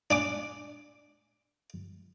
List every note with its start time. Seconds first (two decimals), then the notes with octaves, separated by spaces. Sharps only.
0.11 D4 G#5 D6